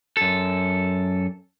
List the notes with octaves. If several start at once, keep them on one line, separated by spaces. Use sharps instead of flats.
F#2 A4